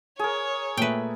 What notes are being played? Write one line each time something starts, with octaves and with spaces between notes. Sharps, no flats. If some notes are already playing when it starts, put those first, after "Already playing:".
G#4 A#4 C#5
A#2 A3 B4 E5 G5